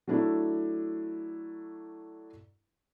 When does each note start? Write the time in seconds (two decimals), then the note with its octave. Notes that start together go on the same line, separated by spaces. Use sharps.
0.08 F#3 A3 D4 E4